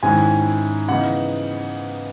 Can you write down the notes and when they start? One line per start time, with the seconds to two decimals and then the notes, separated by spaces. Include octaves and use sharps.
0.03 G#2 D#3 G#3 C#4 E4 G#5
0.89 C#3 E3 B3 D#4 F#5